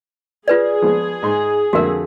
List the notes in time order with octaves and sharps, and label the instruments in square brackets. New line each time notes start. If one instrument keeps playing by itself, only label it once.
[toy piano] F4 B4 D5 [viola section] G#4
[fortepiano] F3 G#3 B3
G#2 D#4 C6
[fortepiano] F2 D3 E5 [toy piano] F#4 A#4